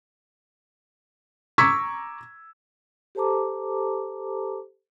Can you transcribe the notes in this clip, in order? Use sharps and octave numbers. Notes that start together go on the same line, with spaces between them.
A#5 C#6 D6 E6 G#6 B6
G4 A4 C5 A5 A#5 D6